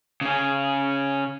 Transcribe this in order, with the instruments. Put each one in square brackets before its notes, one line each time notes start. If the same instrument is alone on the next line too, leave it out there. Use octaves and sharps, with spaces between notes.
[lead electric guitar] C#3 C#4